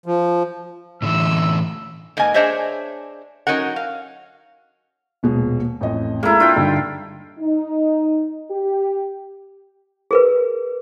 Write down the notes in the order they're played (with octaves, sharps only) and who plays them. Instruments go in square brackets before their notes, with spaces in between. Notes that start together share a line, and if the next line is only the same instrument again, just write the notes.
[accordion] F3
[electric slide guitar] A2 D3 E3 [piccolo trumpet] E6
[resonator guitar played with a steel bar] G#2 A#3 A#4 D#5 G#5
D4 G#4 C5 C#5 D#5 E5
F#3 C#4 D#4 A#4 F#5
F5
[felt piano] D#1 B2 G#3
A1 F2 D#5
[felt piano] G#3 A4 [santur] A#3 E4
[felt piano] D4 [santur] F4 G5
[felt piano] G2 D3 D#4
[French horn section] D#4
G4
[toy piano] G#4 A#4 B4